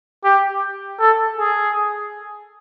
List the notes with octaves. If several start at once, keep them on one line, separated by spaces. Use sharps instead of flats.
G4
A4
G#4